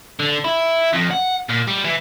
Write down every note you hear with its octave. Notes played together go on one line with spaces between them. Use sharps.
D3
E4
F2
F#5
A#2
G3
E3